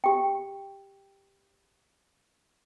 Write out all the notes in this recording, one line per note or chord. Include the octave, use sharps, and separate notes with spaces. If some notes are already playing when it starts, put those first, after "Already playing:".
G4 G5